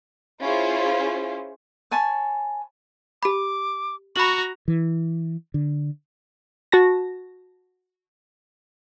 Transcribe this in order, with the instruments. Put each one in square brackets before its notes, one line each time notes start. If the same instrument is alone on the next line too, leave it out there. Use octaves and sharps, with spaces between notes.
[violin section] C#4 E4 F4 G#4 C5
[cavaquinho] C#5 G#5 A5 B5
[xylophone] G4 B5 [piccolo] D6
[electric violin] F#4 A#5 [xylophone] B5 F#7 [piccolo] C#6
[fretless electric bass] E3
D3
[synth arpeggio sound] F#4 A5 A#6